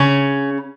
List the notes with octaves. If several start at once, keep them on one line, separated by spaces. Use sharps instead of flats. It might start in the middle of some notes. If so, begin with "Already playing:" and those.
Already playing: C#3 C#4